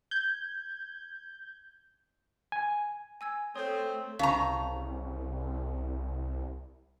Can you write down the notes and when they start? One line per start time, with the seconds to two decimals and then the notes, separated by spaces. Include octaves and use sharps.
0.11 G6 G#6
2.52 G#5
3.21 G#5 E6 G#6
3.56 A3 C4 C#5 D#6 G6
4.19 C2 C#3 F5 A5 A#5 C#6